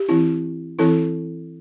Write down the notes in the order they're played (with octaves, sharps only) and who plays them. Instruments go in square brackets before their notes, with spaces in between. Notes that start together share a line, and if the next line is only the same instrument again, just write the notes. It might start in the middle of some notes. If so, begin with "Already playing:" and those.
Already playing: [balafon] G4
E3 C4 E4
E3 C4 E4 A4